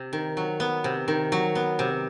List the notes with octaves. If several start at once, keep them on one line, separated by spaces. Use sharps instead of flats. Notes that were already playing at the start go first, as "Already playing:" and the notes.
Already playing: C3
D#3
F#3
B3
C3
D#3
F#3
B3
C3